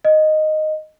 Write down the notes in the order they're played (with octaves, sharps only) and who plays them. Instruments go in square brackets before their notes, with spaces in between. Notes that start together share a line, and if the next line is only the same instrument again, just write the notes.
[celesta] D#5